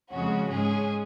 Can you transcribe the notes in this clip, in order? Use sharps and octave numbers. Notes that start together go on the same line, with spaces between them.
F2 C#3 G#3 C#4 F#4
G#2 G#3 C#4 G#4